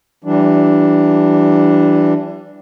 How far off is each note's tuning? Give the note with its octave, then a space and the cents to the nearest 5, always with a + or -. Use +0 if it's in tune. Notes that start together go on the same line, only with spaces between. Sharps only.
E3 +15 G3 -25 D4 +0